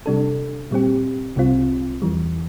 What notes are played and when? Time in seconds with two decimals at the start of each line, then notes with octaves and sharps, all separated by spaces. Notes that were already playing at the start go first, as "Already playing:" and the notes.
0.06 C3 G3 D4 A4
0.71 A#2 G3 C4 G4
1.36 C2 C3 G3 C4 F4
2.02 E2 E3 G3